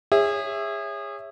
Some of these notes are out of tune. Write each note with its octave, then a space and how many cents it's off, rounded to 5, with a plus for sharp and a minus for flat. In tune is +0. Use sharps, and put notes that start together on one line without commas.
G#4 -30 C#5 +0 E5 +0